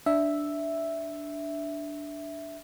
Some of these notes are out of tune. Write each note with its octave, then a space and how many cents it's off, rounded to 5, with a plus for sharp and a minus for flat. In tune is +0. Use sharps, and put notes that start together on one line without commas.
D4 +0 E5 +0